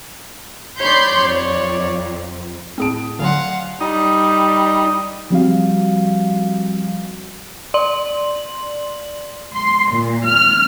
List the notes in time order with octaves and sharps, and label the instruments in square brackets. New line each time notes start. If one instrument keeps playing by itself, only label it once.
[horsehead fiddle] C#5 D5 [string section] B5 C6 G6
[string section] F2
[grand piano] A2 D#6 D7 [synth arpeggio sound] C4 G#4 A5
[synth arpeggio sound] D3 F#3 [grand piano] D5 G#5 C6 [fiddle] F5 F#5
[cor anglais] G3 [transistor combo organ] D#4
[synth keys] F3 G3 C4 F#4 F5
[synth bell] D5 C6 F#7
[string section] C6
A#2
F6